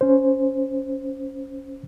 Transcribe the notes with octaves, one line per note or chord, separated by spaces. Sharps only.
C#4 C5